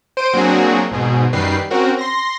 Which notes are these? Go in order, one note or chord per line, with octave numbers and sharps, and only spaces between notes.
C5 C6 D7 D#7
F#3 A#3 C4 D4 F#4 G#4
G#1 G#2 B2 G#4
F#2 D#3 G3 B4 C7
C4 C#4 F#4 A#4
C6 A#6